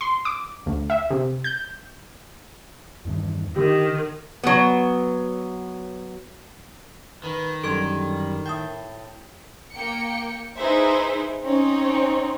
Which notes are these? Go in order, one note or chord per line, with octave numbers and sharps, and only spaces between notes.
C6
D6
D2
E5
C3
G6
E2 G2 D#3
D3 D#3 G4
F#3 B3
D#3 B4
F#2 D3 F#3 G3 A4 C6 G#6
A2 E4 G5 A5 D#6 G6
A#3 G5 C#7
D#4 E4 G#4 B4 C5 E5
C4 C#4 D#4 C#5